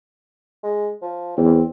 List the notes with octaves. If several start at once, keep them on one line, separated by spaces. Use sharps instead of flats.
G#3
F3
E2 C4